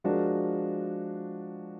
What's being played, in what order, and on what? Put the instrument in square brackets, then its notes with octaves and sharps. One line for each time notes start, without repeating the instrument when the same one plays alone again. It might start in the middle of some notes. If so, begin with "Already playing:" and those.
[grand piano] F3 G#3 D4 F#4 A#4